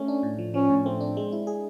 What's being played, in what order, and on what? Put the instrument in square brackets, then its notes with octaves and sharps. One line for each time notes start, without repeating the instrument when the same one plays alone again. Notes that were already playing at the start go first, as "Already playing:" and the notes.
Already playing: [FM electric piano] A3 [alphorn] C#4
[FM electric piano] D4
A2
F3
[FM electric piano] F3 [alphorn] C#4
[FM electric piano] A2
[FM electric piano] A3 [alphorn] C4
[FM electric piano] D4
G#3
E4
G#4